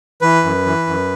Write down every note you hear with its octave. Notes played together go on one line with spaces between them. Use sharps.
E3 B4
F#2
E3
F#2